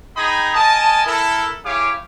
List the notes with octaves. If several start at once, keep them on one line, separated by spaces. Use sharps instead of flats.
D#4 G#4 G5 A#5 B5 D#6
A#4 D#5 G#5 A5
E4 A4 A#4
E4 G4 G#4 C#5 F5 D6